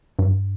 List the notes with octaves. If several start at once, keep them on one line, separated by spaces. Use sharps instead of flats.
G2